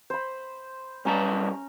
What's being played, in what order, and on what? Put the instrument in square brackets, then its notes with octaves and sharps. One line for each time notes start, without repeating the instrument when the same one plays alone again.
[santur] C5 B5
[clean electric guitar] B1 G3 A5 [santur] C#4 A#5